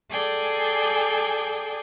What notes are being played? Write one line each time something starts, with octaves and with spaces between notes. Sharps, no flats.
G#4 A4 D5 G5 G#5